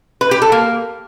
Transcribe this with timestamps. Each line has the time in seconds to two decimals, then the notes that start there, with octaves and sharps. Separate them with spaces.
0.21 B4
0.31 G4
0.42 A4
0.52 A#3